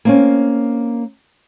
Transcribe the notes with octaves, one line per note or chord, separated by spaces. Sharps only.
A#3 C4 C#4